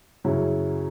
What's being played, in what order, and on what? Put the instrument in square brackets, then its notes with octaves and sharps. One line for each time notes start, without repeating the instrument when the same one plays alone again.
[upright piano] F#2 C#3 F#3 C#4 E4